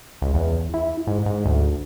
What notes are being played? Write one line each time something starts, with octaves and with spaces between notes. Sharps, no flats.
C#2
E2
E4
G#2
G#2
D2